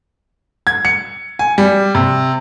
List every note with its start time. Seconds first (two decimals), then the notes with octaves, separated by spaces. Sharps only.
0.67 G#6
0.85 C#7
1.39 G#5
1.58 G3
1.95 C3